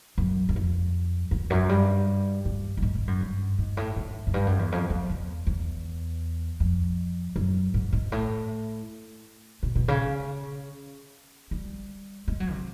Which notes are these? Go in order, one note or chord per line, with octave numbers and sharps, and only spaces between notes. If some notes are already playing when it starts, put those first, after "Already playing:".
F#2
F#2
F2
E2
F#2
G2
G2
G2
G#2
G#2
F#2
G2
G#2
A2
G#2
F#2
G2
F#2
E2
F2
F2
E2
E2
F2
F#2
G#2
G#2
A2
B2
B2
C#3
G3
G#3
F#3
C3